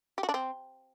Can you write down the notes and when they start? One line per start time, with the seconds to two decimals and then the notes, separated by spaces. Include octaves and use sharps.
0.18 G4
0.23 F#4
0.29 D4
0.34 C4